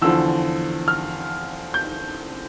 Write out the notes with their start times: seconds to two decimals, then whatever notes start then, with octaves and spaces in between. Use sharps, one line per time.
0.02 E2 D3 F3 E6
0.88 F6
1.74 G6